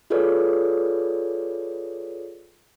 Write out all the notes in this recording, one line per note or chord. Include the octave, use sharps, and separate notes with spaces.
F4 G#4 A4 B4 C#5 D5